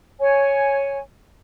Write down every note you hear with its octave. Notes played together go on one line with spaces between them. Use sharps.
C#5 G#5